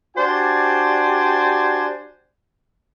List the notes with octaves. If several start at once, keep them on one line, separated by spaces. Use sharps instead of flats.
D4 F#4 G4 C5 D5 G#5